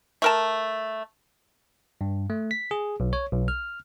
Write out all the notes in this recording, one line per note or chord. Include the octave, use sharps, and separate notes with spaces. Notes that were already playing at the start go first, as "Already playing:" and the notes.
A3 A#4 A5
G2
A3
B6
G#4
B1
C#5
B1
F6